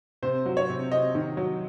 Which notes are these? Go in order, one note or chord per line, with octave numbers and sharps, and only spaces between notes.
C3 C5
F#3
C#5
C3
C3 D#5
D#3
F#3